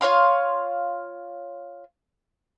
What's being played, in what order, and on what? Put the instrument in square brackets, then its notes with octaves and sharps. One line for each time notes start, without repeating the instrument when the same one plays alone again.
[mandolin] F4 C#5 F5 C6